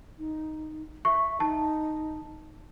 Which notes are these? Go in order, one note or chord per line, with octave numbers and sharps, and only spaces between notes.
D#4
E5 C#6
D#4 A5